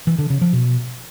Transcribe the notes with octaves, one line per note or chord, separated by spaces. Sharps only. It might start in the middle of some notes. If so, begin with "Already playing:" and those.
E3
D3
C#3
F3
B2